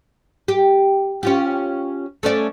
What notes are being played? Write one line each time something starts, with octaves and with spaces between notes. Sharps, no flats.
G4
C#4 F4 G4
A3 C#4 D5